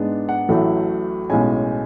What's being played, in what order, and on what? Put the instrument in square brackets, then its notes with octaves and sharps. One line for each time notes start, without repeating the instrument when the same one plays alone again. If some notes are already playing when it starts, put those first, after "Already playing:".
Already playing: [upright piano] G#2 G#3 B3 D4
F#5
A1 A2 F#3 A3
B1 A2 G#3 C#4 G#5